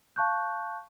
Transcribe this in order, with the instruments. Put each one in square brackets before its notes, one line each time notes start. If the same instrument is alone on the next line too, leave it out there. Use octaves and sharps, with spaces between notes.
[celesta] F5 A5 C#6 F#6 G6